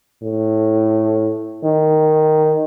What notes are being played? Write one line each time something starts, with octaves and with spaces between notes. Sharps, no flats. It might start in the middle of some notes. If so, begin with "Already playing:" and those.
A2
D#3